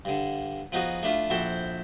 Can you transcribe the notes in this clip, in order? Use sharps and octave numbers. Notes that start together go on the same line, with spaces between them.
G2 D3
F3 B3 D#4 F#4 G#4
A3 D4 E4 F4
A#1 E4 F#4 A4 C5 G5